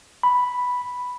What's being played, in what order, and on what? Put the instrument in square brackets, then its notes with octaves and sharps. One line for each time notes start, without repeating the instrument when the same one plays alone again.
[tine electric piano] B5